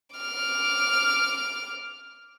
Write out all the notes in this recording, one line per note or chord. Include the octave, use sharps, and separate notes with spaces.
D6 F6